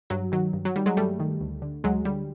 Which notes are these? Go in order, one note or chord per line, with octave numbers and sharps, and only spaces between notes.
G2 F#3
D#3 F#3
G2
F#3
D#3 G3
F#3 G#3
G2 G3 A3
D#3
D2
D3
D2 F#3 G#3
D3 G3